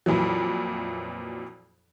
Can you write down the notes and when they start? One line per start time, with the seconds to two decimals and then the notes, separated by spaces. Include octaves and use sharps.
0.06 F2 A#2 E3 F#3